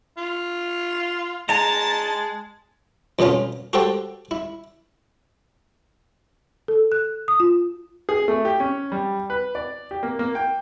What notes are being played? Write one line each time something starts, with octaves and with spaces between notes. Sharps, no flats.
F4
G#3 A5 A#5
F2 B2 B3 C#4 F4
F#4 G4 A4 C5 G5 A5
E4
A4
F#6
D#6
F4
G#4
A3
G4
C#4
G3
B4
D5
G4
A#3
A#3
G5